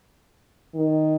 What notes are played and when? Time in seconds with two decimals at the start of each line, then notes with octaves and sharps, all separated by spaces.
0.75 D#3